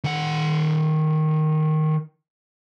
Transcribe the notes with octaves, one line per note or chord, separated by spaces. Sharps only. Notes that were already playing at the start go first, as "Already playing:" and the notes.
D#3 F#5